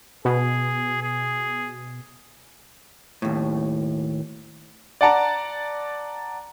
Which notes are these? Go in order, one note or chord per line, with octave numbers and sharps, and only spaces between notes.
B2 G#4
G#4
D#2 A2
D5 F#5 A5 A#5